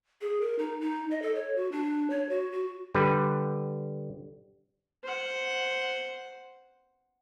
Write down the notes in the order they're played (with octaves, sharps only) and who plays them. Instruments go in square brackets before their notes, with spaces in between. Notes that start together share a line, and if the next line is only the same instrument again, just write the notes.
[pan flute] G#4
A#4
D#4
D#4
D#5
A4
C#5
F#4
D4
C#5
F#4
F#4
[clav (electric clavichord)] D3 G3 B4
[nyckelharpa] C5 F#5